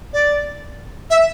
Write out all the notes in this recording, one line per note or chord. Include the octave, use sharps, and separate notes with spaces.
D5
E5